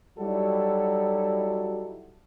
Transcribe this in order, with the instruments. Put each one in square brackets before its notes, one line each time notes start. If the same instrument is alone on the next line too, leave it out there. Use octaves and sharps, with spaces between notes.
[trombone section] F#3 G3 D#4 E4 F#4 A4